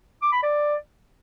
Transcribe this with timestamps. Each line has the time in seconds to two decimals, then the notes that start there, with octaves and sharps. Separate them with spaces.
0.22 D6
0.32 B5
0.43 D5